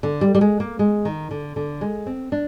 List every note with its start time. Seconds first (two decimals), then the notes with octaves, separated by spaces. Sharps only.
0.03 D3
0.21 G3
0.35 G3
0.41 G#3
0.60 A#3
0.79 G#3
1.05 D#3
1.31 D3
1.56 D3
1.81 G#3
2.07 C4
2.32 D4